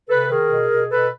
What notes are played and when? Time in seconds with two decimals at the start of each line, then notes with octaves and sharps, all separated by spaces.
0.09 C3 A4 B4
0.29 D#3 G#4 A#4
0.50 B2
0.70 B2
0.91 B2 A4 B4